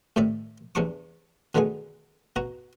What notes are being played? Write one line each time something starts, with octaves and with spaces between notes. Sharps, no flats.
A2 C3 D#3 D5 E5
E2 C3 E3 D4 C#6 D6
B2 D3 D#3 A3 B3 G#4
B2 F#4 A#5